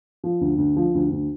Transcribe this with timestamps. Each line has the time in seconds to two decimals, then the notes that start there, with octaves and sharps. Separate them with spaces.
0.24 F3
0.41 D2
0.58 D2
0.76 F3
0.95 D2
1.11 D2